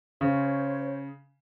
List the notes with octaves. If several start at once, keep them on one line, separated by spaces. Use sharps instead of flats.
C#3 C5 C#5